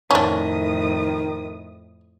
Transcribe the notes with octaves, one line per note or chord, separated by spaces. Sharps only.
F2 A2 D#3 C#4 D4 D#6